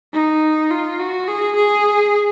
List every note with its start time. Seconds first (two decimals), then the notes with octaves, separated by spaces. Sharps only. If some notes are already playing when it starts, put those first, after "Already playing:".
0.14 D#4
0.71 F4
0.99 F#4
1.28 G#4
1.56 G#4